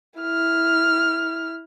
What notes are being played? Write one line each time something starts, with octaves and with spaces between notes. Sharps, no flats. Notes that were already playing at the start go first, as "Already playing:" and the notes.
E4 F6